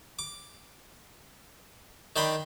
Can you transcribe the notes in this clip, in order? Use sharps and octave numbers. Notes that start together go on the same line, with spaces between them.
D6
D#3 D4 G5 B5 C6